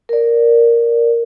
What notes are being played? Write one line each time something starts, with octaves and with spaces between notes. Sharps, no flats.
A#4 D5